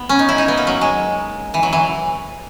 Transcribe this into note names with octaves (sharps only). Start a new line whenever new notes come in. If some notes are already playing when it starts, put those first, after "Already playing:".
Already playing: B3
C#4
D#4
E4
D#4
B3
A#3
F#3
G#3
E3
F#3
E3